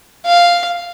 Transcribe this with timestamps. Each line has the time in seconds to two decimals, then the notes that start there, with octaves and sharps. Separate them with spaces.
0.26 F5